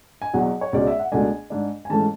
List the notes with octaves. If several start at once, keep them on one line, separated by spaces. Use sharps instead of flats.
G#5
E2 B2 F#3 F#5
C#5
C#2 B2 G#3 C#4 D5
E5
F#5
C#2 B2 A3 D4 G#5
G#2 G#3 D4
G#5
G#2 E3 A3 C#4 A5